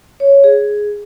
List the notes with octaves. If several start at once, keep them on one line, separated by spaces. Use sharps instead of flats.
C#5
G#4